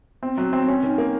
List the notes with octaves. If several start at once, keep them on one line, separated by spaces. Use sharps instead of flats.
C4
F#3
C4
C#4
D#3
A#3